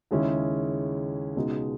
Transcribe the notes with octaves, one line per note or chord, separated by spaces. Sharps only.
D#2 C#3 G#3 C#4 E4
C#2 B2 G#3 D#4